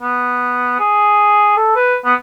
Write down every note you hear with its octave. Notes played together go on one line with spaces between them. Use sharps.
B3
G#4
A4
B4
B3